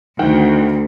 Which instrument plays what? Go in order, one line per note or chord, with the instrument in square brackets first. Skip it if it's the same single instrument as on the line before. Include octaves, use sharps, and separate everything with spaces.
[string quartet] D2 [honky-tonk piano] D#3 F#5 G5